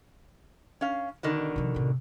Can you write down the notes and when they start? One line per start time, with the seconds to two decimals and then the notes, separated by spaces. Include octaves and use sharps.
0.81 C#4 F5
1.23 B2 D3 D#3
1.56 C3 F3
1.74 A2 C3